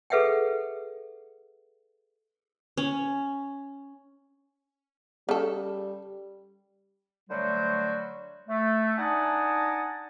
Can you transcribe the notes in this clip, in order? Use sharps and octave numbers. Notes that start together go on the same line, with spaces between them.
G#4 A4 B4 E5 F#5 G5
C#4
C#3 G3 A4
D3 F#3 G3 A3 F#4 C5
A3
D4 D#4 F#5 G#5 A5 D#6